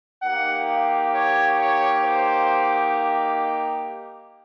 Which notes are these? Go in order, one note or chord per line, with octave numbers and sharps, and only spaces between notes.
A#3 D#4 G4 F#5
F5
C#5
C#5
C5